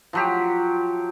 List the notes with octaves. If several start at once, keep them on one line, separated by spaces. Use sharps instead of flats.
F3 F#3 G4